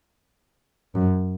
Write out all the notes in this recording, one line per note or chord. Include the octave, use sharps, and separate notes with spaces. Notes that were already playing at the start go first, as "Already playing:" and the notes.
F#2